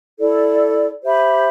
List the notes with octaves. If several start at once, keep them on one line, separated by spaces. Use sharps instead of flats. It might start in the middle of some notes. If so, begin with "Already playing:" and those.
E4 A4 D5
G4 C5 E5 B5